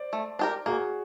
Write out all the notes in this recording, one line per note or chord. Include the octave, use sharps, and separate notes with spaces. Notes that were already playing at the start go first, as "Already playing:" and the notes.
Already playing: C5 D5
A3
D4 G4 A#4
A#3 F#4 G#4